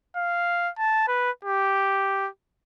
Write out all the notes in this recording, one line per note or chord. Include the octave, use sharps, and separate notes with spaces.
F5
A5
B4
G4